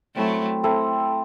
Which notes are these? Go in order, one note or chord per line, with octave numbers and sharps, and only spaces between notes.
F#3 A3 C4 E4 A4
C4 E4 A4